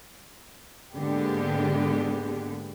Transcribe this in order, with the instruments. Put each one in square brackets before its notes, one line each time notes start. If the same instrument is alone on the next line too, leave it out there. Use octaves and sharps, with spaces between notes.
[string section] G#2 D3 G#3 A#3 B3 G4